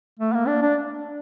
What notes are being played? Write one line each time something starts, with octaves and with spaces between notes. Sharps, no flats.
A3
A#3
D4
D4